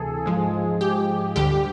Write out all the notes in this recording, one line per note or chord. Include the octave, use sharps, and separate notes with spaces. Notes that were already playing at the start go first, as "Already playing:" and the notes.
Already playing: D2 C3 E3 G#4 A4
G#2 F3 G#3
G4
D2 D3 G3 G4